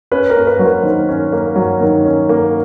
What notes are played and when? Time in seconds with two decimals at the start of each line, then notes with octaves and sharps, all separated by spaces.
0.12 C#4 B4
0.30 A#4
0.36 A#3
0.47 B4
0.59 F#3
0.65 A#4 C5
0.83 D#3
1.09 C#4
1.32 A#3
1.56 F#3
1.81 D#3
2.05 C#4
2.29 A#3